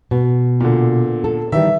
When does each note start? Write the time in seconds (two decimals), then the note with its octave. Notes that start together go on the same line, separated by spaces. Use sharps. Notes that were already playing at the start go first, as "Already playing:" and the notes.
0.11 B2
0.60 A#2 D3
1.24 A4
1.52 D#3 E3 G3 E5